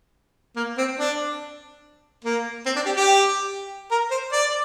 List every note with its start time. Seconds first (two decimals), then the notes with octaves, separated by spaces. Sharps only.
0.56 A#3
0.78 C4
0.99 D4
2.24 A#3
2.66 C4
2.76 D4
2.86 G4
2.96 G4
3.91 A#4
4.11 C5
4.32 D5